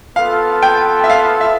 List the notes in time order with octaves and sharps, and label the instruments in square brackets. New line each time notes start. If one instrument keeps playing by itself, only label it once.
[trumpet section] B3 F4 A4 [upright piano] F5
[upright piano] G5
E5
F5
E5